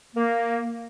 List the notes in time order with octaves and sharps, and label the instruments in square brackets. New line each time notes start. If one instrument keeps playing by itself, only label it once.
[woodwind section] A#3